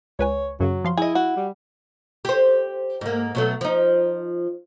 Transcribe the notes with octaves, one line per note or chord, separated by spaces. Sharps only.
C#2 B4 C#5 G#5
F#2 C#3 F#3
F3 F5 C6
E4 G#4 D#5
F#4
G3
G4 C5
G#2 A#3
B2 F#3 A3
F3 D#4